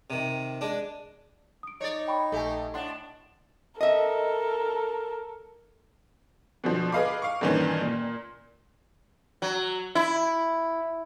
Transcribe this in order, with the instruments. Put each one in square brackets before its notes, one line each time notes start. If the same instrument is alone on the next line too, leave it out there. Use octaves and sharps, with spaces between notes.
[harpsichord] C3 D#3
G#3 D4
[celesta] D#6 D7
[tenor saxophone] D#4 [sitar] C#5 D5
[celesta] G5 B5 C#6
[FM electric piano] A#1 G#5 [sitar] A3 G4 [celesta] A4
[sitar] A2 D4 [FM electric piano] D#5 F#5 C6
[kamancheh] A4 A#4 [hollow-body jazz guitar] D#5 E5
[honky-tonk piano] B2 D3 F3
G#4 B4 D#5 F5 B5 D6
F5 C#6
G2 A#2 D#3 E3 C#4
A#2
[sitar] F#3
E4